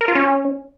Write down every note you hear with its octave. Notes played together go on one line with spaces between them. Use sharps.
A#4
F4
C#4